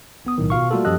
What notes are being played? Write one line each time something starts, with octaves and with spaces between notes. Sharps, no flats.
G1 B3 D#6
B1 A2 D#3
B2 F4 F5 C#6
G3 A3 A#3 F4 F#4 A4
F#2 F3 G4 A4 D#5 F#6